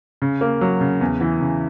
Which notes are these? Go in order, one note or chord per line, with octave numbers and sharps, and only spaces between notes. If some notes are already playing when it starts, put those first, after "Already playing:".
C#3
A#3
F#3
C#3
E2
E3
C#3